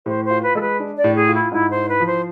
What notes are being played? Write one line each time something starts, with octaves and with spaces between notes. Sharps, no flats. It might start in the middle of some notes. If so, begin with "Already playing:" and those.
A2 C5
C5
F4
B4
G#3 A4
B4
D4
D5
A2
G#4
F4
E4
G#2 E4
C5
E4
B4
F3
C5